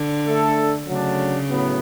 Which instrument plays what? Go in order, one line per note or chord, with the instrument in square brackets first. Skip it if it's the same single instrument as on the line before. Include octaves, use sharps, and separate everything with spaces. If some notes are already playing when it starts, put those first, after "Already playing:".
Already playing: [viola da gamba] D3
[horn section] A3 D4 A4
[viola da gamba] C#3 [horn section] F#3 A3 D4
[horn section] A2 F#3 B3